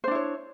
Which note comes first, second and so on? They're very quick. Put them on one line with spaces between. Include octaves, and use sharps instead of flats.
C5 D4 E4 C#5